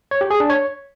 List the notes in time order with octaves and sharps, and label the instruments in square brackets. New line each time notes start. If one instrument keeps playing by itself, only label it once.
[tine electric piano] C#5
G4
G#4
D4
C#5